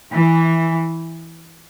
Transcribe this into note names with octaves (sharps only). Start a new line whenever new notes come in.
E3